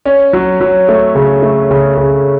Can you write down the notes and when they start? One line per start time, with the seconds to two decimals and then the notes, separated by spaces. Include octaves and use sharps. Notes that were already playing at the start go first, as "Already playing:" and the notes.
0.05 C#4
0.33 F#3
0.61 F#3
0.88 A3
1.15 C#3
1.42 A3
1.71 C#3
1.97 C#3